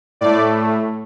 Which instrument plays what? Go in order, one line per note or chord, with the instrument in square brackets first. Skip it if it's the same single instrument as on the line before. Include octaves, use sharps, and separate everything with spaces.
[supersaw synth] A2 A3 D5